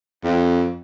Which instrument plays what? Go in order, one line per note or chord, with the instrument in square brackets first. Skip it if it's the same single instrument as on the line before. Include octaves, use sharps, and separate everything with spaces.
[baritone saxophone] F2